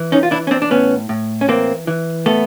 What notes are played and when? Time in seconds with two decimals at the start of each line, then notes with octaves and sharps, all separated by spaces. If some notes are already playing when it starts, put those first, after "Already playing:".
Already playing: E3
0.12 C#4 D#4
0.23 F4
0.31 E3 D4 E4
0.47 C#4
0.51 C4 D4
0.62 D4
0.70 A2 B3 C#4
1.09 A2
1.41 C#4
1.48 E3 A#3 C4
1.87 E3
2.26 A2 A3 B3